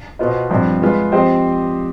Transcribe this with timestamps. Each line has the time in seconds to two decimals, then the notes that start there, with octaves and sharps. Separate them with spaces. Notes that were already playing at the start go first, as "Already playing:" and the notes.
0.19 B2 B3 F4 C5 D#5
0.50 G2 F3 C4
0.82 G#3 B3 F4 B4
1.12 F3 C4 G4 C5 D#5